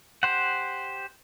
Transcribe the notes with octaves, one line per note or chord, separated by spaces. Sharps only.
G4 C5 F#5